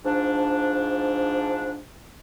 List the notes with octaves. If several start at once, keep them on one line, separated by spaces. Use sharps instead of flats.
G#2 F3 D4